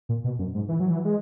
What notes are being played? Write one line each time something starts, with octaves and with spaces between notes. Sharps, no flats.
A#2
B2
F#2
G#2
E3
F#3
E3
G#3